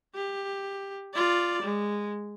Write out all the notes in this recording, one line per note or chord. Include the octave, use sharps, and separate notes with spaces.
G4
F4 D5
G#3